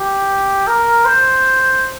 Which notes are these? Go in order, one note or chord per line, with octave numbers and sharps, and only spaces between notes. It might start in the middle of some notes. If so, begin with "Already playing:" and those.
Already playing: G4
A#4
C5